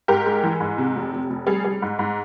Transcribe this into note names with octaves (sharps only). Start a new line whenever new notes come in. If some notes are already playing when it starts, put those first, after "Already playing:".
G#2 G4 A#4
G#3
E3
G#2
C3
F1
F1
F1
G3 G#4
G3
G#2
G#2